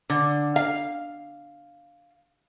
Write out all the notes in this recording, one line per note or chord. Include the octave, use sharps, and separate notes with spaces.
D3
F5